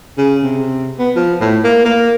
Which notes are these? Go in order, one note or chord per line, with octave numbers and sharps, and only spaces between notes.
C#3
C3
B3
F3
A2
A#3
A#3